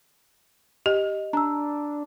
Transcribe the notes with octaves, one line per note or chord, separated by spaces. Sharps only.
G4 D#5
D4 A#5 E6